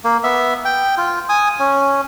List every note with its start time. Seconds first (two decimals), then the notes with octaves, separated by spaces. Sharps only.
0.04 A#3
0.23 B3 E5
0.65 G5
0.97 F4
1.29 G#5 D#6
1.59 C#4